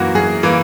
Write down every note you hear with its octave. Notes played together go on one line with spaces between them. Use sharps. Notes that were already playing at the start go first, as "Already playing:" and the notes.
Already playing: F#2 E3 A#3 F#4
F#2 G#4
E3 A#3